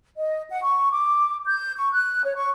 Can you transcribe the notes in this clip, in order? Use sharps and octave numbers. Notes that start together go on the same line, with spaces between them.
D#5
F#5
C#6
D6
G6
C#6
F#6
C#5
C#6